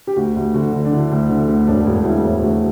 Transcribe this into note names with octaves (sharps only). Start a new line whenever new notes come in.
G4
D2 F#4
D2
D3 F#4
D3
D4
D3 E4
D2
D3
D2
E1 D4
E1
D2 E4
E1
D2 F#4